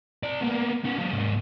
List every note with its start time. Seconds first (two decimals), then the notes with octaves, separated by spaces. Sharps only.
0.23 C4 D5
0.41 A#3 B3
0.84 B3 C#4
0.98 F#3 F4
1.12 G#2 A#3